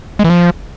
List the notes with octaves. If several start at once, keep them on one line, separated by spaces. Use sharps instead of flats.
G#3
E3
F3